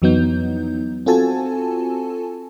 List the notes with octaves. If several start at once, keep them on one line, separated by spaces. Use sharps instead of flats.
F2 E3 F#3 B3 D#4 G6
C4 F4 F#4 A4 G#5 A5